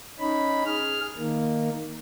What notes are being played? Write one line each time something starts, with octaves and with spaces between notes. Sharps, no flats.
C#4 D#4 B5
G#4 F6
D#3 A#3